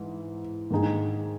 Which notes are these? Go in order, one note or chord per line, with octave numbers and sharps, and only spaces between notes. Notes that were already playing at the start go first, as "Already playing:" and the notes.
Already playing: G#2 E3 E4
G#2 D#3 A#3 D#4 G#4